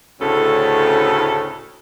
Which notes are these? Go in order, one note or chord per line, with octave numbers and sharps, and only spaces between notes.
D2 A2 C#3 C#4 A4